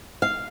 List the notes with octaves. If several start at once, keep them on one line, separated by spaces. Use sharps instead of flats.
F5